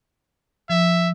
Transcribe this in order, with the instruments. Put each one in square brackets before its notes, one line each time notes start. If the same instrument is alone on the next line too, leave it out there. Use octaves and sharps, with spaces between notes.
[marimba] F3 [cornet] E5